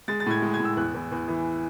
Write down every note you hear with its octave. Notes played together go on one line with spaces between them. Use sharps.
G#3 A6
A6
A2 G#6
G#3
G#6
A2 E6
E2 F#6
E2
E2
E3